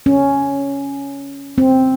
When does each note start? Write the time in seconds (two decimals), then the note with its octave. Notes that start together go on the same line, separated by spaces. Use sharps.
0.06 C#4
1.58 C4